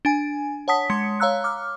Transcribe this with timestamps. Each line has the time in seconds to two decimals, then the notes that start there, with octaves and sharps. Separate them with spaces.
0.05 D4 G#5
0.68 C#5 F#5 A5 D#6 B6
0.90 G#3 C6 C#7
1.20 C#5 F5 A#5 E6 F#6
1.44 D6 F6